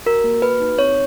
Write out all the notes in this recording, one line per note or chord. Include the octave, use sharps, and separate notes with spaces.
F#4 A#4
A#3
F#4 B4
D#4
C4 C#5